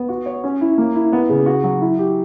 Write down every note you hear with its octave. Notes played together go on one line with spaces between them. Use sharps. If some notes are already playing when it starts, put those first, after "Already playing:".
Already playing: B3
F#4
C#5
C#4
E4
A#3
E4
B3
C#3
F#4
F#3
E4
G4